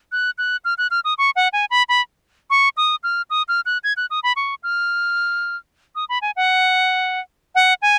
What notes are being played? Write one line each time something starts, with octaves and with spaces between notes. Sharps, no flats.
F#6
F#6
F6
F#6
F6
D#6
C#6
F#5
G#5
B5
B5
C#6
D#6
F6
D#6
F6
F#6
G#6
F#6
D#6
B5
C#6
F6
D#6
B5
G#5
F#5
F#5
G#5